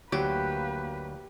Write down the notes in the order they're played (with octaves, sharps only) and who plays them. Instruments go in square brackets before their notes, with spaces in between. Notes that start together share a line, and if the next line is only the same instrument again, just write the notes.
[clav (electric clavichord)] D2 F#3 [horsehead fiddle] A#3 B4 [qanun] G4